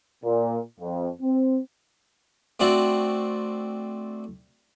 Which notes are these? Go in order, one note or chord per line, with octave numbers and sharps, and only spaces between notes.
A#2
F2
C4
A3 C4 D4 F#4